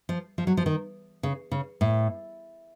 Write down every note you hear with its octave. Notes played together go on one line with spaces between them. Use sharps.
F3
F3
F#3
F3
D#3
C#3
C#3
A2